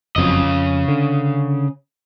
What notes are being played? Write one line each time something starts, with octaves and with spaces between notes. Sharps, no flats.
F#1 F2 C#3 F#3 D#5
F2
D3